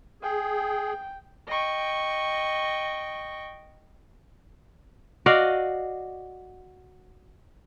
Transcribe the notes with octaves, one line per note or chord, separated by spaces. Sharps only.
G#4 G5
D#5 G5 C#6
F#4 D5 D#5 F5